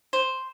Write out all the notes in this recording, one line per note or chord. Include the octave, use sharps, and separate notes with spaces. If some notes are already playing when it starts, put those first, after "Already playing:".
C5